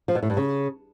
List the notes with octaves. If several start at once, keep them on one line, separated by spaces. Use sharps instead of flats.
F3
B2
A2
G2
C#3